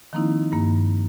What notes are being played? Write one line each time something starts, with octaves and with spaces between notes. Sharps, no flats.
D#3 F3 A#3 C4 D#4 E4
G2 A#3